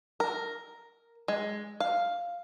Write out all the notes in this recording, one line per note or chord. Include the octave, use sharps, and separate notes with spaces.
A#4
G#3
F5